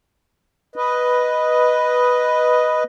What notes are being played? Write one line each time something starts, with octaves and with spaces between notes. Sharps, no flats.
B4 D#5